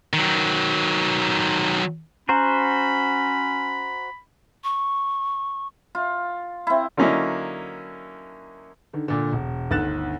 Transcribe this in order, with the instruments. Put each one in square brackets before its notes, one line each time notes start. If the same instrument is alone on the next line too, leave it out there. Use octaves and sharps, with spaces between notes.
[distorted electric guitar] D#3 F#3
[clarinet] C#4 [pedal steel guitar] F#4 C5 F#5 [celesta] A#5 [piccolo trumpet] B5
[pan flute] C#6
[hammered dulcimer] F4
C4 E4
[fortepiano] D3 F#3 A#3 C#4 D#4 E4
[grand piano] D3 D#3
A#2 D3
E1
G1 D2 D#3 F#6 A6 E7